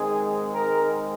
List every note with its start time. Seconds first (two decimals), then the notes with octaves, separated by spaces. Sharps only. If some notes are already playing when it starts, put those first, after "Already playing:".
Already playing: G#2 D#3 G#3 C4 G#4
0.55 A#4